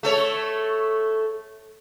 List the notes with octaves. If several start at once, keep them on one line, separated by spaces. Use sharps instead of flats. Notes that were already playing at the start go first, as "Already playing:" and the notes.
A3 A4 C#5